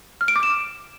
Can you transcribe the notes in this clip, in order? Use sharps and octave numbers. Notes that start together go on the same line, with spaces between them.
F6
D7
D6
E7